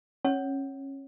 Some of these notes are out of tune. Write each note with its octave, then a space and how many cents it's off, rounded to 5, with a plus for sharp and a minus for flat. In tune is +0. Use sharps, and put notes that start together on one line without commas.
C#4 -30 C#5 +0